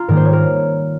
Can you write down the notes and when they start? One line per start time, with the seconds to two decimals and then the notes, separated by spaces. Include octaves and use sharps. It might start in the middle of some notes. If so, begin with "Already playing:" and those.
Already playing: F4 A#5
0.08 G#2 D#3 G3 A#3 A#4
0.17 C5
0.25 C#5
0.33 A#4